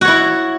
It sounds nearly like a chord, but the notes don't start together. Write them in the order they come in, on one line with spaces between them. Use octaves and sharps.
F#4 C#5 E4